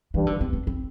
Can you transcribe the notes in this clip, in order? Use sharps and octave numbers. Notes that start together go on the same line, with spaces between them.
G2 E3
D3
C4
C4
C4